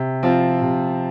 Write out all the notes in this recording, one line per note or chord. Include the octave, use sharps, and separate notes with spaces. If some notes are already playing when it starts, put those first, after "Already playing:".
Already playing: C3
F3 C4 F4
C3